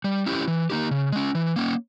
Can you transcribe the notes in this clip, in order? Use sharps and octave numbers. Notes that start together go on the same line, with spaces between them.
G3
C#4 E4 G4
E3
A#3 D#4 G4
C#3
G#3 C#4
E3
A#3 C#4